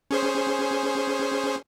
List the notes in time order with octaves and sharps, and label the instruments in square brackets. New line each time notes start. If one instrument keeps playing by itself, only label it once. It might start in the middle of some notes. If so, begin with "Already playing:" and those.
[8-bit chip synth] C#4 G#4 C5